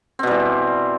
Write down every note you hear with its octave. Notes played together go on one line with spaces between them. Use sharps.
B2 E3 G3 C4